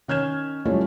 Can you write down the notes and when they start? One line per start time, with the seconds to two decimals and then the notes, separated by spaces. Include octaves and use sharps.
0.08 D#3 C#4 F6 G6 G#6 E7
0.65 F#3 G3 A3 C#4 E4 F4